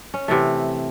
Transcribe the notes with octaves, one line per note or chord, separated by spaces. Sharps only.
C#4
C3 E3 A3